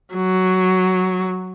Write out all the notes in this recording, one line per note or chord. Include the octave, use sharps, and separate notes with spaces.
F#3